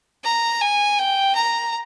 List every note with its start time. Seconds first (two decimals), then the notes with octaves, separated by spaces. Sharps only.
0.24 A#5
0.61 G#5
0.98 G5
1.35 A#5